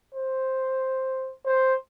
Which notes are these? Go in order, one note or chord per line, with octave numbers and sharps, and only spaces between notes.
C5
C5